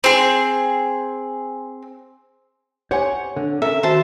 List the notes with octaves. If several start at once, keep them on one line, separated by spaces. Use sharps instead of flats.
C4 G#4
G4 C5 C#5 F#5 G#5
D3
C#4 A4 A#4 E5
D#3 F#4 C5 E5 A5